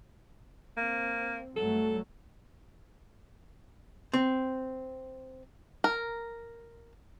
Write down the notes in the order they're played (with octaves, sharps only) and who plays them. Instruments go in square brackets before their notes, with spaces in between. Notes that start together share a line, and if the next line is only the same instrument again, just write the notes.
[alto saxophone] A#3 [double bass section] C4
[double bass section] G2 F#3 A3 [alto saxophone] A4
[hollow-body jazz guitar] C4
[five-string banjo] A#4